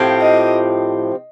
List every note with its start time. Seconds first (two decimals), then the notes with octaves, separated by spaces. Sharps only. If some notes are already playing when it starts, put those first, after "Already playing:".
Already playing: A2 F3 C4 G4
0.21 D#5